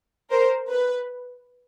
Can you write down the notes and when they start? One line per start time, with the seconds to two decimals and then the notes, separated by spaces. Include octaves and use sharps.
0.31 A#4 C5
0.69 B4